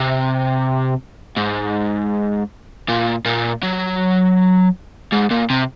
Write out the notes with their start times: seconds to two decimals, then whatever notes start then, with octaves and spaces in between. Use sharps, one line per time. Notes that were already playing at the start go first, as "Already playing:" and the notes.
Already playing: C3
1.37 G#2
2.88 A#2
3.26 A#2
3.63 F#3
5.12 G#2
5.30 A#2
5.50 C3